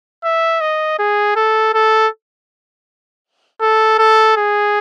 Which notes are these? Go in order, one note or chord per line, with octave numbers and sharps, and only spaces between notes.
E5
D#5
G#4
A4
A4
A4
A4
G#4